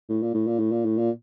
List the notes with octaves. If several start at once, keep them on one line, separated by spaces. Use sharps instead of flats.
A2
A#2
A2
A#2
A2
A#2
A2
A#2